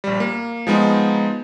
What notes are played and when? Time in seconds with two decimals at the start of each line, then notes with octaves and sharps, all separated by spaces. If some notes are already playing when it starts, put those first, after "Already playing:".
0.04 A#1 G3
0.20 A#3
0.67 F3 G#3 B3 D#4